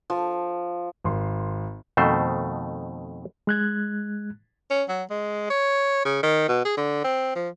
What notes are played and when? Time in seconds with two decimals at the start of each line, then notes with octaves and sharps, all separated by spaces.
0.10 F3
1.04 G#1 C6
1.97 F2 B2 D#3 A3 C5
3.47 G#3 F#6 G#6
4.71 C#4
4.89 F#3
5.10 G#3
5.50 C#5
6.05 C#3
6.23 D#3
6.48 B2
6.65 G#4
6.77 D3
7.04 C4
7.36 F3